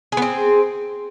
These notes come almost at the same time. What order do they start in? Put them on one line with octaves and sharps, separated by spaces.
G#4 B3 C4